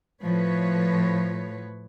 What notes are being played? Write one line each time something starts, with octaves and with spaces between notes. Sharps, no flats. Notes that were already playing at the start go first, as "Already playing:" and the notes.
A2 F3 B4 C#5